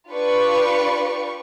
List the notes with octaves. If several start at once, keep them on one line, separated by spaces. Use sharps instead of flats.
D4 F4 G4 B4 D5 C#6